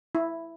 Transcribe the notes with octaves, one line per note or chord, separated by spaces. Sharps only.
E4